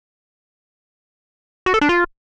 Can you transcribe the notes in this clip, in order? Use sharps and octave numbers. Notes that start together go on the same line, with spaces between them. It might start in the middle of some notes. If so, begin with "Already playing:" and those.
F#4
A4
D4
F4